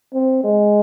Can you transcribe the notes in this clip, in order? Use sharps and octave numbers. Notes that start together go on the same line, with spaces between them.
C4
G#3